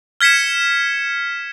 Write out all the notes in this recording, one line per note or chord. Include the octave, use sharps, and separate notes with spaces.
F6 G#6 B6 C#7 E7